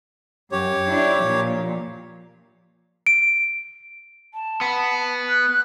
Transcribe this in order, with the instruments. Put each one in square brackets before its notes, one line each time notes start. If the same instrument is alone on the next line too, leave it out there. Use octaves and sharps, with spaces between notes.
[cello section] F#2 [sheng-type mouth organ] G4 C#5
[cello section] D4 E4
A#2 F3
[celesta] D7
[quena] A5
[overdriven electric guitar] B3
[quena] F#6